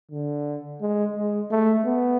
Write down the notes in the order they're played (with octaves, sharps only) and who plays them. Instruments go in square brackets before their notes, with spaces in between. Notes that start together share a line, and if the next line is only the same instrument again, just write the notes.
[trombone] D3
G#3
G#3
A3
B3